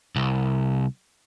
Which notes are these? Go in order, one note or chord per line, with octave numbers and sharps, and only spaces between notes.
C2